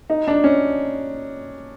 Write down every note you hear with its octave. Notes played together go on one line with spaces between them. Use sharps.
D#4
D4
C#4